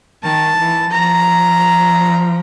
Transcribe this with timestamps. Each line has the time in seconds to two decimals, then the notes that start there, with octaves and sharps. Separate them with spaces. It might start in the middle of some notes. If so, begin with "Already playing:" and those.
0.23 D#3 A5
0.58 E3
0.91 F3 A#5